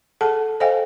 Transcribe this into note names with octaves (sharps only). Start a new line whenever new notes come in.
G#4 A4 F#5 A5
A4 C5 D#5 F5 G5 G#5